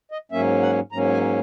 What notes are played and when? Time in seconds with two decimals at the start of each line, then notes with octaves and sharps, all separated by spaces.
0.12 D#5
0.32 G#2 F#3 A#3 C#4 E5
0.62 F#5
0.92 G#2 F#3 A#3 C#4 A#5
1.12 G#5